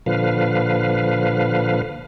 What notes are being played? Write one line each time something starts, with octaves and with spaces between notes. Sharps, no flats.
A#2 D3 F3 B4 F5